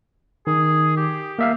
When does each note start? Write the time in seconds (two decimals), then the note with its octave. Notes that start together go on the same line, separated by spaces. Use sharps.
0.47 D#3 G#4
0.97 G4
1.39 A#3 E5 F5